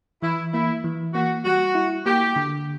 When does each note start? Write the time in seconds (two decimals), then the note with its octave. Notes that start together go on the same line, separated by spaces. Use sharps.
0.22 E3 E4
0.53 A#3 E4
0.84 E3
1.14 A#3 F#4
1.45 G3 F#4
1.75 E4
2.06 A#3 G4
2.36 D3